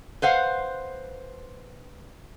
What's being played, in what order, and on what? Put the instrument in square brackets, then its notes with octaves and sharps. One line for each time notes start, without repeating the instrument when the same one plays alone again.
[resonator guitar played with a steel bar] B4 C5 F5 F#5